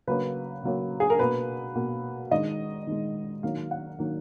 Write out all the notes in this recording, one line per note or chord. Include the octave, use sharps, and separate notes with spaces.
C#3 F#3 A#3 B4
C#3 F#3 A#3
G#4
A#4
B2 A#3 B4
B2 A#3
D#3 G#3 D#5
D#3 G#3
D#3 F#3 A#3 F5
F#5
D#3 F#3 A#3